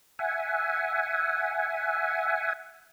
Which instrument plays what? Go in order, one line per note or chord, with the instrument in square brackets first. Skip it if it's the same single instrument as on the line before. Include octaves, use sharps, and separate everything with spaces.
[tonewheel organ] E5 F#5 G#5